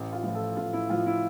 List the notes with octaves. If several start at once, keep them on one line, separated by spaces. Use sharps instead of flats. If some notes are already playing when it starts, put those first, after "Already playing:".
Already playing: A1
F4
A2 F3
A4
A1 F4
E4
A2 F3 F4
E4